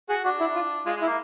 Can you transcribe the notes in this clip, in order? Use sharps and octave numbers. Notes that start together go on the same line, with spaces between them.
F#4 G#4
D4 F#4
E4
F4
G#3 F4
G#3
E4
A#3